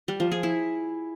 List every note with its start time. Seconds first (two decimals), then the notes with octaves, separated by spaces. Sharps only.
0.08 G3
0.20 F3
0.32 G#4
0.43 E4